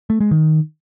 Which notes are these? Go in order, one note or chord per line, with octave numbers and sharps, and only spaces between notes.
A3
G#3
D#3